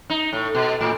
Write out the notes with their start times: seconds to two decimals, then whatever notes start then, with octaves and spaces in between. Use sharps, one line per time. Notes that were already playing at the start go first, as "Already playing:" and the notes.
0.10 D#4
0.33 A2
0.55 B2
0.81 A2